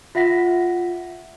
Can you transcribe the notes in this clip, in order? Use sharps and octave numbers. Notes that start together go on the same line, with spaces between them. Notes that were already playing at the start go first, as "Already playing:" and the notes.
F4 E5 F#5 A#6 B6